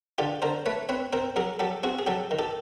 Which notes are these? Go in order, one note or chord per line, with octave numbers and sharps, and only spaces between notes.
D3 F4 G4
D3 A#4 C5
A3 B4 C#5
C4 B4 C#5
C4 A#4 C5
F#3 G#4 A#4
F#3 G4 A4
C4 F#4 G#4
G#4
F#3 G4 A4
D#3
G4 A4